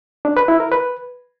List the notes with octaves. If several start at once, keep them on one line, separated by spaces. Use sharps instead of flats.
D4
B4
E4
A#4
B4